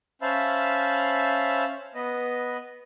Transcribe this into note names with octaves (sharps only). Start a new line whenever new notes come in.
C#4 C5 E5 F5 A5 B5
B3 B4 D#5